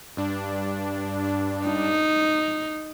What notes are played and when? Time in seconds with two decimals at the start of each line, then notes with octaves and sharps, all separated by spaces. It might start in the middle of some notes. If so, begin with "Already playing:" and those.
0.17 G2 D4
1.68 D#4